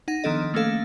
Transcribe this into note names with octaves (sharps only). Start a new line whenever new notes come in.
D#4 F#5 A#6
D#3 F3 B3 D4 A4 D#5
A3 A#3 C#4 A4 F5